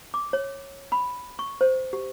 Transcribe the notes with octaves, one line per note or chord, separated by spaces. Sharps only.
D6
C#5
B5
C#6
C5
G4